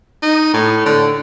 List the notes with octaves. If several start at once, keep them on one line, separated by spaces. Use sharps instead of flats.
D#4
A2
D3